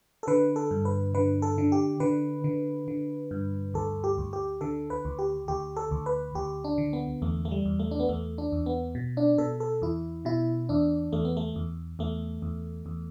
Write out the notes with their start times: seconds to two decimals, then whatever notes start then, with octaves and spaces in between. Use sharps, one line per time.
0.23 A4
0.27 D3 B4
0.56 A4
0.71 G2
0.85 B4
1.15 D3 B4
1.42 A4
1.58 D3
1.72 G4
2.00 D3 B4
2.44 D3
2.88 D3
3.31 G2
3.74 D2 A4
4.04 G4
4.18 D2
4.33 G4
4.61 D3 A4
4.90 B4
5.05 D2
5.19 G4
5.48 D2 G4
5.76 A4
5.91 D2
6.06 B4
6.35 D2 G4
6.64 D4
6.78 D3
6.93 B3
7.22 E2 A3
7.45 A3
7.51 G3
7.65 E2
7.80 A3
7.91 D4
8.00 B3
8.09 E2 A3
8.38 D4
8.52 E2
8.66 B3
8.95 B2
9.17 D4
9.38 B2 A4
9.60 A4
9.82 E2 E4
10.25 B2 E4
10.69 E2 D4
11.13 E2 A3
11.25 B3
11.37 A3
11.56 E2
11.99 E2 A3
12.42 E2
12.86 E2